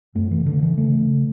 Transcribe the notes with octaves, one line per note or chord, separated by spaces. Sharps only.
F#2 A3
E3
C#3
D3
C#3
E3
C#3 A3
C#3